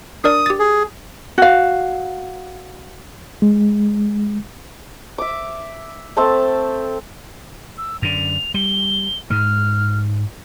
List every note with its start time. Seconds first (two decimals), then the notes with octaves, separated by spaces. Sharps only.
0.24 D4 A#4 D5 D#6
0.46 G4 A6
0.59 G#4
1.38 F#4 F5
3.42 G#3
5.18 E5 D6
6.17 A3 C4 C5 A5
7.78 E6
8.02 F#2 D3 F7
8.54 G3 G7
9.30 G#2 G#3 F6